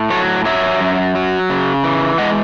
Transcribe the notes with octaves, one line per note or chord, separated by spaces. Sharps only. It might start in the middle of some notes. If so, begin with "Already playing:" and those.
Already playing: A2
F#3 A4 C#5
F#3 C#5 E5
F#2
F#3
C#3
E3
G#3 D#5 F#5